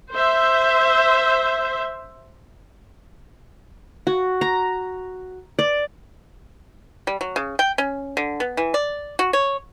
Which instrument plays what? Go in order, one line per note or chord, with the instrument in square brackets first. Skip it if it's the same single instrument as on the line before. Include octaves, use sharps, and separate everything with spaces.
[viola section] C5 E5
[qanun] F#4
A#5
D5
[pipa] G3
F#3
C#3
G5
C#4
D3
B3
E3
D5
F#4
C#5